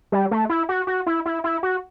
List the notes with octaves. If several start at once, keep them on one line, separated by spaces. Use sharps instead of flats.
G3
A3
E4
F#4
F#4
E4
E4
E4
F#4